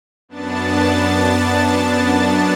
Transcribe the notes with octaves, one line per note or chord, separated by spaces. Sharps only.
F#2 B3 D4 A5 A6